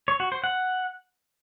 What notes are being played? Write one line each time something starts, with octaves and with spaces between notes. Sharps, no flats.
C#5
F#4
C5
F#5